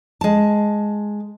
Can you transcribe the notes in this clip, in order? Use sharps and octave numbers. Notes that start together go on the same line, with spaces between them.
G#3 A5